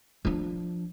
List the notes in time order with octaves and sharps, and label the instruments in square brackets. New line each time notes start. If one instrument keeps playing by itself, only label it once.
[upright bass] F3 D4